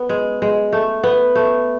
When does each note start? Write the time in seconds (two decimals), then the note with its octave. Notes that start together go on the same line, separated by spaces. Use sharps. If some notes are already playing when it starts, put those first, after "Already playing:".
Already playing: B3
0.09 G#3
0.42 G#3
0.73 A3
1.03 B3
1.35 A3